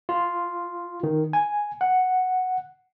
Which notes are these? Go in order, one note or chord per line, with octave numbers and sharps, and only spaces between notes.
F4
D#3
G#5
F#5